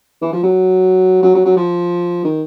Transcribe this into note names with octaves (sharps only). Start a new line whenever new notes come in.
E3
F3
F#3
F#3
F#3
F#3
F3
D#3